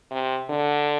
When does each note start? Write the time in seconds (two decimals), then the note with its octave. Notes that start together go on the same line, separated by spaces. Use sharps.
0.11 C3
0.49 D3